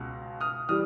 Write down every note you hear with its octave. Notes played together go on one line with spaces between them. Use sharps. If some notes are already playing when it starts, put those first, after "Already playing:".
Already playing: C#2 B2
D#6 F6
E3 G3 D#6 F6